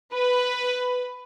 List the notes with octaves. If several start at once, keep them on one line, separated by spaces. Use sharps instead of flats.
B4